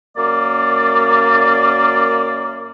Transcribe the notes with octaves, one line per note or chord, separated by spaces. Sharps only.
F#2 A#3 D5